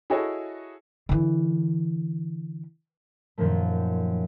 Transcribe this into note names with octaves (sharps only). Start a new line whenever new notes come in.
E4 F#4 G#4 A4 C#5 D#5
D3 E3
F#2 A#2 D#3 F3 A3